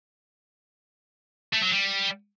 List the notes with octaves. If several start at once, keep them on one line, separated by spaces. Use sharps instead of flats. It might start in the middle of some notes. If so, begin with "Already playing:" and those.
A3
F#3
G3